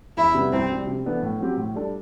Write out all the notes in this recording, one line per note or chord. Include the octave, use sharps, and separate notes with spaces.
E2 E4
C3 G3 B3
C2 C4
C3 G3
C3
E3 B3 D4 A4
A2
F#3 C4 G4
A2
G3 D4 A4